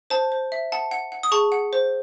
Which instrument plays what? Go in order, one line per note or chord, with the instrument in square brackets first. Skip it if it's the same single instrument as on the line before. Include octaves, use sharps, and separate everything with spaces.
[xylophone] C5 A5
C5
E5
F#5 A5
F#5
F#5
D#6
G#4 A5 C#6
F#5
C5